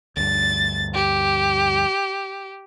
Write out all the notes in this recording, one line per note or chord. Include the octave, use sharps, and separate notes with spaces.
D2 G2 A6
G4